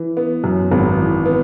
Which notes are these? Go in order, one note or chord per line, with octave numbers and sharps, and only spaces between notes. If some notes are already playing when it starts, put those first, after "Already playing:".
Already playing: E3
B3
F#2
G#1
E3
B3